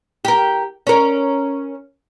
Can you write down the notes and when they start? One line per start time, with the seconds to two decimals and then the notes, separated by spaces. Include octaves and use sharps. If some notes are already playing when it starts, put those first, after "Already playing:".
0.25 G4 A#4
0.87 C#4 A#4